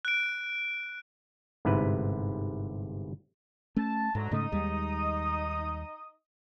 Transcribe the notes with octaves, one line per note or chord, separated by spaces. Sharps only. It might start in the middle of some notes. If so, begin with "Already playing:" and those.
F#6 D7
G1 G#2 C3 E4 B4
A3 C#4 A5
D2 G#2 F#3 A#5
G#2 C#3 A3 D#4 D#5 D#6
D#2 G3 G#3